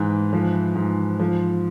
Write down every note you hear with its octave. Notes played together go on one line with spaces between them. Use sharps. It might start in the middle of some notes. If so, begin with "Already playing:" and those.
Already playing: G#2 E3
F3
G#2
F3